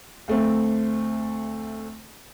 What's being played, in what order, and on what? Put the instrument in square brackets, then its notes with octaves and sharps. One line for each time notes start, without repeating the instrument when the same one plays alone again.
[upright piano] D2 A3 C4